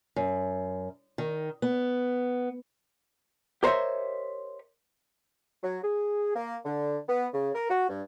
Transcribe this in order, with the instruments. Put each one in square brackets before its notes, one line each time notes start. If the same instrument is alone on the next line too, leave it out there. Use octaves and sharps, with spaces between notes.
[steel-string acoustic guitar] F#2
D#3
B3
[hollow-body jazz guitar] G4 A#4 C5 C#5 D#5 E5
[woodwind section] F#3
G#4
A#3
D3
B3
C#3
A#4
F#4
G2